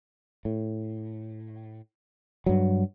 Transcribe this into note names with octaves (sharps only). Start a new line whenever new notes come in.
A2
G2 F#3